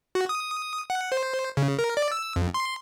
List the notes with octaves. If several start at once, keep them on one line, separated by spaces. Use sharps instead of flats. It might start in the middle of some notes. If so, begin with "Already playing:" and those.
F#4
D#6
F#5
C5
C#3
A#4
D5
E6
F2
C6